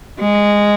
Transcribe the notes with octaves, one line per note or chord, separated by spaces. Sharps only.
G#3